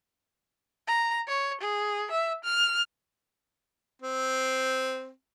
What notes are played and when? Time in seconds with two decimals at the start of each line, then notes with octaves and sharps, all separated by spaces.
0.88 A#5
1.28 C#5
1.61 G#4
2.11 E5
2.44 F6
4.02 C4